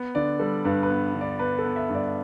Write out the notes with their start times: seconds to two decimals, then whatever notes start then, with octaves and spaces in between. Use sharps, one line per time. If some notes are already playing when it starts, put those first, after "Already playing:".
Already playing: B3
0.15 D3 D5
0.39 G3 A4
0.65 G2 B4
0.83 B4
0.89 B3
1.14 D3
1.21 D5
1.39 B3 B4
1.59 A4
1.65 B3
1.76 E5
1.89 G2
1.95 D5